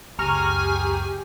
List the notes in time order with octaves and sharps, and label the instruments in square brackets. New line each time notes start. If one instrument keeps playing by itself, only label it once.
[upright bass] C#2 F#2 [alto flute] G4 [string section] G#4 G#5 [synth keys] A#5 C#6 F6